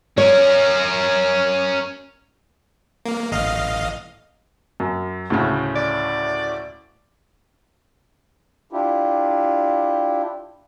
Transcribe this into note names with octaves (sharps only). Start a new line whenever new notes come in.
C#4 A#4 C#5
A#3
A1 D#5 F5
F#2
D2 A2 C#3
D5
D4 E4 F4 G4